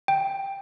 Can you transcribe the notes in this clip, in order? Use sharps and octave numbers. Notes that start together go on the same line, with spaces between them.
G5